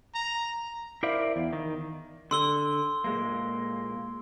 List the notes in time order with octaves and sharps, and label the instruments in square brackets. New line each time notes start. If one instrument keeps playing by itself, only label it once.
[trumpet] A#5
[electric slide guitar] E4 A#4 C5 D5 E5 F5
E2
D#3
[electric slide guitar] D3 [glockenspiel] C6 E6 G7
[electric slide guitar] A#2 G#3 A#3